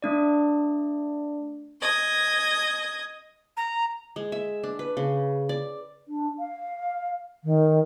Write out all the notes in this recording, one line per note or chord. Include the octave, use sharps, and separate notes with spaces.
A3 D4 D5
D#5 G#6
A#5
G#3
E5
D4
B4
C#3
D5
D4
F5
D#3